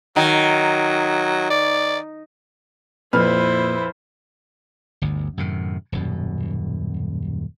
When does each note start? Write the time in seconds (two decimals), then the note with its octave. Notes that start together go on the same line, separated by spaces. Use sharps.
0.16 D#3 F#3
1.50 D5
3.13 F2 A#2 E4 B4 C5 F6
5.02 G1 D2
5.37 F#2 A2 C3 D#3
5.92 D#1 F#2 B2